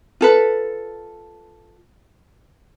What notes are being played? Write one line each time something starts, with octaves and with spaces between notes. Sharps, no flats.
F4 A4 B4